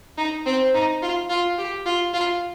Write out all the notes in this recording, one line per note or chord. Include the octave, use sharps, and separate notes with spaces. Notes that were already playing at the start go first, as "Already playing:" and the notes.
D#4
C4
D#4
F4
F4
G4
F4
F4